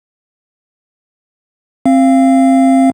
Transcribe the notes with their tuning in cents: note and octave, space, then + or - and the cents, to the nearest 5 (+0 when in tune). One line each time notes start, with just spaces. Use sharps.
C4 +20 F5 -20